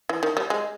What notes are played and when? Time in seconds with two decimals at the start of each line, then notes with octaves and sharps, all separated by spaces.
0.09 E3
0.23 D#3
0.37 G3
0.50 G#3